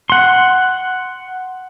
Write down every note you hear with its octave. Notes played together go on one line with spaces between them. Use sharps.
F#5 C6